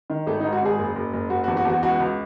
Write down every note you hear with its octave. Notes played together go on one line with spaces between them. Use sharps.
D#3
G#1 A3
D#4
G#2
F#4
G#1 G#4
F#1
F#1
F#1
F#1 F#4
F#4
E2
F#4
E2
F#4
C#2 F#4
C#2